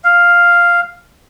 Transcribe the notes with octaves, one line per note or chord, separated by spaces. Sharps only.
F5